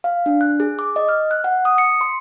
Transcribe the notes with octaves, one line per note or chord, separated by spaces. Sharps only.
F5
D4
F#6
G#4
D6
D#5
F6
F#6
F#5
D#6
C#7
C6